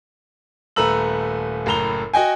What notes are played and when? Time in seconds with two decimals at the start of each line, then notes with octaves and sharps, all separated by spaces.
0.76 D#1 A3 B4 A#5 E6 F#7
1.66 F#1 A2 A#5 F7 G7
2.14 F#4 D#5 G5 G#5